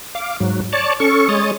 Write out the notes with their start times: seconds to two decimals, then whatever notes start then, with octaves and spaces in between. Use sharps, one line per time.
0.15 F5 D6
0.40 G#2 F#3
0.73 C#5 D5 A5
1.00 C#4 A4 C#6
1.29 G#3 C#5 D#6 A6